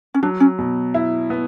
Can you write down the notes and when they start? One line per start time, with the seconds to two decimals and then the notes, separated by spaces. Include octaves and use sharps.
0.14 C#4
0.23 F#3 D4
0.40 C#4
0.59 B2
0.94 E4
1.30 B3